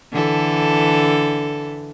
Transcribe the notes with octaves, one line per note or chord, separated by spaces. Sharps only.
D3 E3 A4